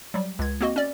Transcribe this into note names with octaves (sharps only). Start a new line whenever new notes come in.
F#3 G3
C#2 G#6
A#3 C4 F#4 D#5
C#4 D5